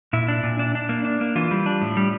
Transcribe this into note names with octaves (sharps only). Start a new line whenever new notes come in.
A#2 E4
D4
A#2
D4
D4
A#3
D4
A#3
E3 F4
G3
D4
A2
G3